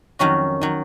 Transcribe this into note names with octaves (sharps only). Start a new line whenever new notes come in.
F2 D#3 F#3 C#4 F#4
D#3 F#3